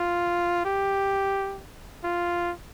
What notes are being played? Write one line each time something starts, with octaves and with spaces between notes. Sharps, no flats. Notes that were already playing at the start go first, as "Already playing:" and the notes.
Already playing: F4
G4
F4